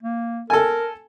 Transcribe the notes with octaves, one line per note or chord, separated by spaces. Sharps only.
A#3
A4 A#4 G#5